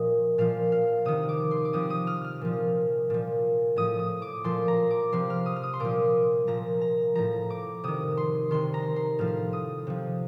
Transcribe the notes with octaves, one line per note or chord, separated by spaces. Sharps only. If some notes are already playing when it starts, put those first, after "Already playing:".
Already playing: A#2 F3 D#5
A#2 F3 F5
F5
C3 D#3 D#6
D6
C6
D6
C3 F3 D#6
D#6
F6
F6
A#2 F3
A#2 F3
A2 F3 D#6
D#6
D6
A#2 F3 C6
A#5
D6
C3 F3 C6
F6
D#6
F6
D#6
C6
A#2 F3 D6
A#2 F3 A#5
A#5
A2 F3 A#5
D6
C3 D#3 D#6
C6
C3 D#3 C6
A#5
C6
A2 F3 F6
D#6
C3 F3